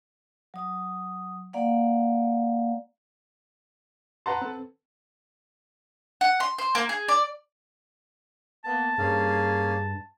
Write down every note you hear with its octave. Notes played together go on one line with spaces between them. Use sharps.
F#3 D#6
A#3 D5 F5 F#5
B4 F#5 A5 A#5 C6
C4 A4
F#5
C6
C5
A#3
G#4
D5
A#3 B3 A5
G2 A#3 C#4 G#4 F5